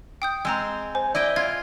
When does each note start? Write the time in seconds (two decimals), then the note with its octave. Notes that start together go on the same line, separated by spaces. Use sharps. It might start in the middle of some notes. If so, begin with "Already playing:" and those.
0.22 G5 D#6 G6
0.45 G#3 C4 A#5 E6
0.95 C5 G#5
1.15 E4 D5 D#5 G5
1.36 F4 G#6